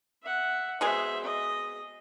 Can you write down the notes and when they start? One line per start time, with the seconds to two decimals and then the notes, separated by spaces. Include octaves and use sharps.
0.23 E5 F#5
0.81 B2 G#3 G#4 C5 E5
1.23 D#5